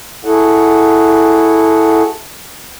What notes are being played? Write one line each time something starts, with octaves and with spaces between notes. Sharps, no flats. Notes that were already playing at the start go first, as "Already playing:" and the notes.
E4 F#4 G#4 A4 F#5